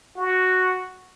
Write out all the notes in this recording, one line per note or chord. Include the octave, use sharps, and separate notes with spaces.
F#4